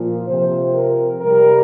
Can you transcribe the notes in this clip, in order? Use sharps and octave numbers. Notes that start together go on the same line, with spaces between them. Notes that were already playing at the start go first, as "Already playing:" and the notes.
Already playing: A#2 F3
C3 F3 C5
A#4
C3 G3 A#4